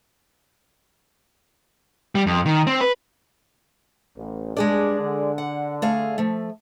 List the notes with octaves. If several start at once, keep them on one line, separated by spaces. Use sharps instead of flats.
G3
F2
D#3
C4
B4
A1
G2 G#3 D4 G#4 D5
D3
F#5
A3 G#4 F5
F3 A3